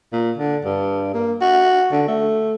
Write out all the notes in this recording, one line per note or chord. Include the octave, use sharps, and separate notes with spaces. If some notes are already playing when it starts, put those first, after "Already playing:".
A#2
D3
G2
A#3
F#4
D3
A3